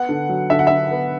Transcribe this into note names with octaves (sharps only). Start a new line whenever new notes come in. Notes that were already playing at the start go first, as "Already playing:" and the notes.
Already playing: B3 F#5
D3
F#3
D3 E5
F#5
D3 E5
B3